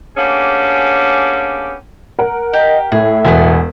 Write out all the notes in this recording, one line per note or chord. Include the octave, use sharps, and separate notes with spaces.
A#3 B3 C#4 D4 G4 G#4
A#4 F#5
G4 D#5
A2 G#4 E5
E1 B3 F#5 G#5